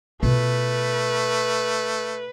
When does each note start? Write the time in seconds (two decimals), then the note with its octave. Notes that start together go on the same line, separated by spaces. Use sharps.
0.23 B2 A3 F4 B4